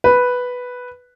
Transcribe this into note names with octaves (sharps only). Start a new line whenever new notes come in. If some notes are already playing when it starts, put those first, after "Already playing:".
B4